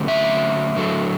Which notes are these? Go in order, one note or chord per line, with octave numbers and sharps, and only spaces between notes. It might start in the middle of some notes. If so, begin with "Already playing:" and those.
Already playing: D3 F#3 A3 C#4
E5
D3 F#3 A3